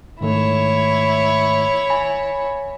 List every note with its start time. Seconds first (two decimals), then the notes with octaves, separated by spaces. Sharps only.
0.21 G#2 D#3 A3 E4 C#5
1.90 G#5 B5